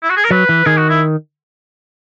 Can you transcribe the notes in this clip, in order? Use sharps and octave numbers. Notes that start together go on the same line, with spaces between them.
E4
F#4
G#4
A#4
F#3 B4
E3
D#3 G#4
F#4
E4